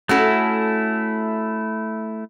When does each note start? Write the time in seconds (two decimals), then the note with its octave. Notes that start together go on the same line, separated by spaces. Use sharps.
0.09 A3 C#4 E4 F#4 A4